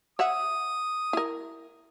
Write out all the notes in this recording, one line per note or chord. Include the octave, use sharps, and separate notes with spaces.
C#5 E5 F#5 D#6
E4 A#4